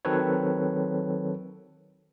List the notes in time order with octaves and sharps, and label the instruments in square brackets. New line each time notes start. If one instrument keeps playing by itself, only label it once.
[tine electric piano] D#3 F#3 C4 A4 B4 C#5